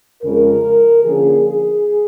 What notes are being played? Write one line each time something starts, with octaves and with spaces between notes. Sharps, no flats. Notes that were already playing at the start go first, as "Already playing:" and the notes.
F2 C#3 F3 G#3 A#4
D3 F3 A#3 C#4 G#4
G#4